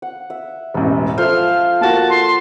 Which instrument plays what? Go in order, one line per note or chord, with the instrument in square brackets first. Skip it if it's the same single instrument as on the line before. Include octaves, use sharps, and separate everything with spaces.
[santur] F#5
E5
[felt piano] E1 A1
[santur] F3 A4 [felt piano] C5 E5 [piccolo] F6
[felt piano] A#3 F#4 [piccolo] A5
[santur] A4 [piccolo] C6